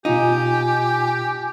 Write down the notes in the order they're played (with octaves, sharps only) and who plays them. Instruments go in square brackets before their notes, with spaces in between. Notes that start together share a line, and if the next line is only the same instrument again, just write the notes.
[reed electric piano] B2 F4 [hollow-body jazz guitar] D#4 [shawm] G4 [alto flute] G#5